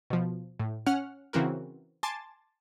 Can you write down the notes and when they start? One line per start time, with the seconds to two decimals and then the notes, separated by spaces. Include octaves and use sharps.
0.10 B2 F3
0.60 A2
0.86 C#4 F#5 F6
1.33 C#3 E3 C4 F#4 A#4
2.03 G#5 A5 C6 D6 A6